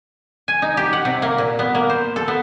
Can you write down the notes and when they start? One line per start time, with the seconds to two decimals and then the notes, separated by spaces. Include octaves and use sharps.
0.48 G#5
0.62 D#4
0.77 G4
0.93 F#5
1.05 C3
1.22 A#3
1.38 A#2
1.59 B3
1.75 A#3
1.90 C5
2.16 A4
2.28 B3